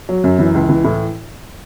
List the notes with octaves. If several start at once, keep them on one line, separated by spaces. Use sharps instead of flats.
F#3
F#2
E3
C#2
E3
A2